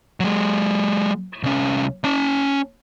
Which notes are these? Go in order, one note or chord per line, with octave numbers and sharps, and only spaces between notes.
F#3 G#3
C2 C#4
C#4 A5